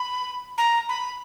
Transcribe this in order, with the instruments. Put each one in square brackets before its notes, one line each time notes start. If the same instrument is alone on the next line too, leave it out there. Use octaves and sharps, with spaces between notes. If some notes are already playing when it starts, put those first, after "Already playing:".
Already playing: [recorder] B5
A#5
B5